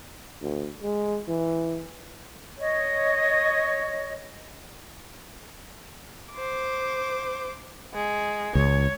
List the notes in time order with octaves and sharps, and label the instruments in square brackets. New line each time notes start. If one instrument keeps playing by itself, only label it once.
[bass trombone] D2
G#3
E3
[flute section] C#5 D#5
[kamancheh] C5 D6
G#3
[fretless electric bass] C#2 [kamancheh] C#5